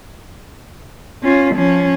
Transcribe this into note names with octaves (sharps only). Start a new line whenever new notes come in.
C#4 F4
F3 C#4